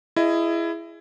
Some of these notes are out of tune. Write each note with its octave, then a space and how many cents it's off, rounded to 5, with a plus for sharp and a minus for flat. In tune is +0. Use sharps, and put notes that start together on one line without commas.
E4 +20 G#4 +0 D#5 +0